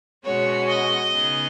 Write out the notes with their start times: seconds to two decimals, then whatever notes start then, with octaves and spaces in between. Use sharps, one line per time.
0.24 B2 G#3 C#4 F#4 C#5
0.68 D#5
1.11 C#3 B3 D#4 G#4